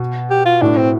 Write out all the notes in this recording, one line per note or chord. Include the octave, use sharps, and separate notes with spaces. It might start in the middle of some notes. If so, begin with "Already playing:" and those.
Already playing: B2
G4
F4
A2 D4
C4